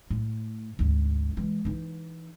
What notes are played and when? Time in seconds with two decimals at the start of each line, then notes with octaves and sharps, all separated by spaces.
0.11 A2
0.79 G#1 D2
1.37 E3 G#3
1.65 E3 D#4